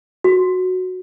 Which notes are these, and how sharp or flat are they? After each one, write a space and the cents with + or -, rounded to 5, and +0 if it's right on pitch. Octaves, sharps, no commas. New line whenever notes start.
F#4 -5